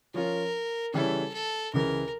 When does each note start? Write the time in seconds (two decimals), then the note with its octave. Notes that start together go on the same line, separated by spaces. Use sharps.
0.14 F3 C#4 F4 A#4
0.93 C#3 E3 G3 C#4 E4 A4
1.33 A4
1.73 C#2 C#3 E3 A#4